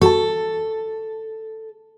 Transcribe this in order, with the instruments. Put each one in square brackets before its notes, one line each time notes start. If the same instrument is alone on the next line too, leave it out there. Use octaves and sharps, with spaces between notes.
[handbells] F#4 A5 [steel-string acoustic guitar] A4